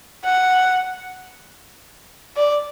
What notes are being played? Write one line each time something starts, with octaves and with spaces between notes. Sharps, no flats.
F#5
D5